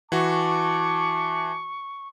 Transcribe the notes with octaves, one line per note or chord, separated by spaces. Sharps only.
E3 F#4 A5 C#6 D6